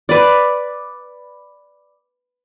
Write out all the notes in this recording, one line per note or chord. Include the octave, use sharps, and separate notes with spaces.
B4 D5